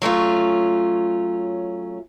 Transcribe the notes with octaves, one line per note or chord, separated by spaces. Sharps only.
F#3 A3 C#4 F4